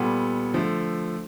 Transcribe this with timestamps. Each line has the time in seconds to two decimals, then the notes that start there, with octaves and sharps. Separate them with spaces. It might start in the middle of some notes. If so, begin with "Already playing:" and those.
Already playing: A#2 G3 B3 A4
0.53 D3 F3 A3